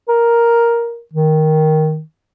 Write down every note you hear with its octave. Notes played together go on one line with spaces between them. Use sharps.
A#4
D#3